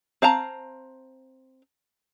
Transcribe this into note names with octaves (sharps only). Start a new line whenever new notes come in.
C4 F5 A5 A#5